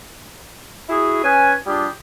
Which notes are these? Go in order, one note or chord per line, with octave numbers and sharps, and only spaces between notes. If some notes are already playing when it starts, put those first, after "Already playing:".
E4 F#4 G#4
C#4 B4 G#5
G3 D4 F4 G4 G#4